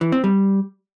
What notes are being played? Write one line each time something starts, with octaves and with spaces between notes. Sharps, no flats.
E3
C4
G3